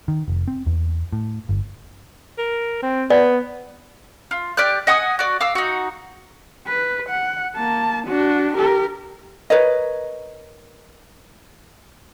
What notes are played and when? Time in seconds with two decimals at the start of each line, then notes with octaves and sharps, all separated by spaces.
0.08 D#3
0.28 F1
0.48 C4
0.66 E2
1.13 A2
1.49 G1
2.38 A#4
2.82 C4
3.10 B3 D5
4.31 F4
4.57 G4 D5 F6 F#6
4.87 D#5 F#5 G#5 D#6
5.19 F#4 D5
5.40 F5 D6 E6
5.55 D#4 F#4
6.67 B4
7.09 F#5
7.56 A#3 A5
8.07 D4 F#4
8.55 G4 A#4
9.50 A#4 B4 C#5 D#5